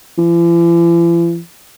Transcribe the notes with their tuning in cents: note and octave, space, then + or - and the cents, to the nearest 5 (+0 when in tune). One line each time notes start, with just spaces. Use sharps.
E3 +45